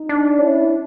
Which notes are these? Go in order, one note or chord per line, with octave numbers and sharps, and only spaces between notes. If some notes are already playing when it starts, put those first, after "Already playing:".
Already playing: D#4
D4
C#4 E4